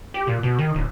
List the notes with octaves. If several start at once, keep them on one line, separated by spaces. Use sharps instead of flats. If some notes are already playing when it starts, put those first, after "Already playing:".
G4
A#2
B2
D#3
D1